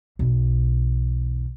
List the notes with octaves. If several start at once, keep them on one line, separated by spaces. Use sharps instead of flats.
B1 E2